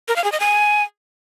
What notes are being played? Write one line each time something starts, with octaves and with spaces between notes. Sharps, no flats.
A#4
F5
G#4
D#5
G#5